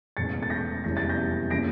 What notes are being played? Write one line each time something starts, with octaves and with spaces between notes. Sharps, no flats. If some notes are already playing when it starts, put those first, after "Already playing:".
E1 E2 E3 A3 C#4 A6 C#7
A6
G6 A#6
F1 E2 E3 G3 C#4 A#6
A6
G6 A#6
C#3 E3 A#3 A#6 D7